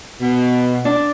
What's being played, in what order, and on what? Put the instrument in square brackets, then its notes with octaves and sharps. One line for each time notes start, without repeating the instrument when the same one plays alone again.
[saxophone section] B2
[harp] D4